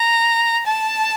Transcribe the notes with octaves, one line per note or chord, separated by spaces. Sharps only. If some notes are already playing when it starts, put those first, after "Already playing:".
Already playing: A#5
A5